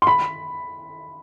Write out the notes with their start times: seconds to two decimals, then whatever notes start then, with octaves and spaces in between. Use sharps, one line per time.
0.02 C6
0.07 B5